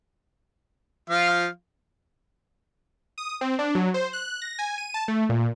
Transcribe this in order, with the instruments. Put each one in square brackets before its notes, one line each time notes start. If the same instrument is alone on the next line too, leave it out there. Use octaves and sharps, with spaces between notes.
[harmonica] F3 F4 F5
[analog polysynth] D#6
C4
D4
F#3
C5
F#6
A#6
G#5
D#7
A5
A3
A#2